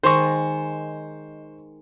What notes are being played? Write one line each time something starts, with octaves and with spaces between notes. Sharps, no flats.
D#3 G#3 C5 D#5 C#6